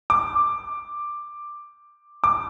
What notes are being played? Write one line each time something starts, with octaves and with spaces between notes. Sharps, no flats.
D6
D6